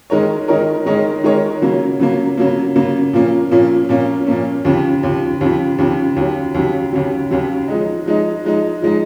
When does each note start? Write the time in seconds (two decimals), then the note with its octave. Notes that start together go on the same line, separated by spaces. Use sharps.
0.10 D#3 G#3 D#4 A#4 C#5
0.48 D#3 G#3 D#4 A#4 C#5
0.86 D#3 G#3 D#4 A#4 C#5
1.24 D#3 G#3 D#4 A#4 C#5
1.62 C#3 F#3 A#3
2.00 C#3 F#3 A#3
2.37 C#3 F#3 A#3
2.76 C#3 F#3 A#3
3.13 A#2 F3 A#3 C#4
3.51 A#2 F3 A#3 C#4
3.89 A#2 F3 A#3 C#4
4.27 A#2 F3 A#3 C#4
4.65 D#2 C#3 F3
5.03 D#2 C#3 F3
5.41 D#2 C#3 F3
5.78 D#2 C#3 F3
6.16 D#2 C#3 F#3
6.54 D#2 C#3 F#3
6.92 D#2 C#3 F#3
7.30 D#2 C#3 F#3
7.68 F3 G#3 D#4
8.06 F3 G#3 D#4
8.44 F3 G#3 D#4
8.82 F3 G#3 D#4